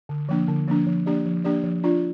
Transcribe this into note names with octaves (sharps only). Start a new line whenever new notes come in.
D3
F3 A#3 D4
D3
F3 A#3 D4
F3
A#3 D4 G4 D5
F3
A#3 D4 G4 D5
F3
D4 F4 D5